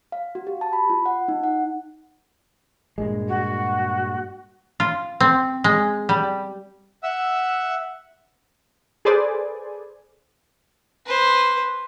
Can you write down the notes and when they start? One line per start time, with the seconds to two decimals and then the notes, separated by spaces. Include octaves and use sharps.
0.12 F5
0.35 F#4
0.47 G4
0.61 A5
0.73 B5
0.90 F4
1.06 F#5
1.28 D#4
1.43 F#5
2.98 G2 A#2 G#3
3.28 F#4
4.80 F4
5.20 C4
5.64 G#3
6.09 G3
7.03 E5 F#5 E6
9.05 G#4 A4 B4 C5 D5 G#5
11.06 B4 C5